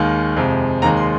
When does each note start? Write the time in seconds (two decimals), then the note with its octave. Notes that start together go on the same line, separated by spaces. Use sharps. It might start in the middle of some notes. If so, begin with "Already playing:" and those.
Already playing: D#2 D#3 G#3
0.36 F2 C3 G#3
0.82 D#2 D#3 G#3 A#5
0.97 C6